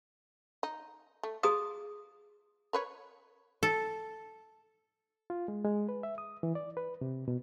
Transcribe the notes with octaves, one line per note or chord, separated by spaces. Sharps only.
D#4
A3
F4 G#4 D#6
A#4 B4 C#5
A4
F4
G#3
G#3
B4
E5
D#6
E3
D5
B4
C3
B2